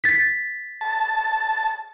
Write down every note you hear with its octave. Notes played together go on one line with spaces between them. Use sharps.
A6 B6
A5